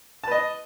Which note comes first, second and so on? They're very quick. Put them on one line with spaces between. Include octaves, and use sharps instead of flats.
A5 B4 D#5